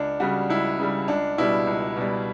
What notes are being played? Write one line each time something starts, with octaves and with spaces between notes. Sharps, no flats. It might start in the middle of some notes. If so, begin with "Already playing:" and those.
Already playing: C#2 D4
C#3 G3 F#4
C#2 E4
C#3 G3
C#2 D4
B2 G3 E4
C#2
B2 G3